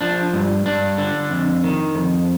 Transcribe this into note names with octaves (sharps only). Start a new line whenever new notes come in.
F3 D4
G2
G2 D4
D3
F2
D#3
F2